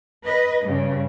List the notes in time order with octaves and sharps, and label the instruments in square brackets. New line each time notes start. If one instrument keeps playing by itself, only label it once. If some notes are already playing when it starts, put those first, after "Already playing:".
[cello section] B4 D#5
G2 C#3